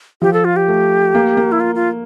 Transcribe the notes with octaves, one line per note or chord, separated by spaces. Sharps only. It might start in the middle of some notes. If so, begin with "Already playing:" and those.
F3 G4
A4
F4
G4
A3
A#3
A#3
E4
F4
F4